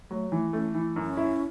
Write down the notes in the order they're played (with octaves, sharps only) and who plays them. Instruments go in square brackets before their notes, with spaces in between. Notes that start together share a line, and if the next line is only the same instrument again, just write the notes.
[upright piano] F#3 [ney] A3
[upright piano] E3 [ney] A3
[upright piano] A3 [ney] C#4
[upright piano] E3 [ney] E4
[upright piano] F#2
[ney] C#4
[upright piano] E4